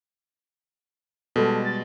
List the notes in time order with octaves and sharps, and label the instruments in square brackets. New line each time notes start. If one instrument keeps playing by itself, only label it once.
[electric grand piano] B2 G3 G#3 [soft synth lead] A4
[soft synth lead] A6